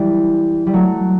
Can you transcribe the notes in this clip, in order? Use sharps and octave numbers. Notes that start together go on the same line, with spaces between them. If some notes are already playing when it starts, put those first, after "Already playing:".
Already playing: E3 G3
G3
F#3 A3